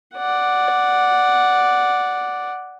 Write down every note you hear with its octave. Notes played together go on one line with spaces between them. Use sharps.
D5 F#5